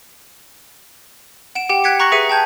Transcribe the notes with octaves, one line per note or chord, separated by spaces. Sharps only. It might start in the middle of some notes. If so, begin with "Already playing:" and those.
F#5 D7 E7
G4 F#5 G5
G5 F#6 G#6 B6 C#7
A#5 C#6 F#6 A#6 C#7 F#7
G#4 B4 E5 C#7 D#7
G5 A5 G6 G#6